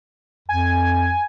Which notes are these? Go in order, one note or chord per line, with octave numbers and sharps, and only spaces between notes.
F2 G#5